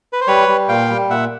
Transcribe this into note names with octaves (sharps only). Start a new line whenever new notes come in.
B4
C5
G3 B4 C#5
G3
A#2 F5 G5
G3
A#2 E5 F#5